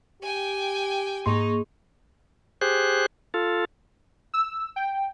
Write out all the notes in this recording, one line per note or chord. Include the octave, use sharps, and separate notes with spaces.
G4 G5 G#5
G#2 A#3 D#4 G#4 C6 C#6
G4 G#4 C5 F#6
F4 A4
E6
G5